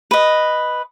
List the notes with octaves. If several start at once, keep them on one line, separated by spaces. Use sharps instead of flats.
B4 D#5